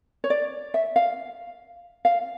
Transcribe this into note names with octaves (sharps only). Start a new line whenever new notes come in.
C#5
D5
E5
F5
F5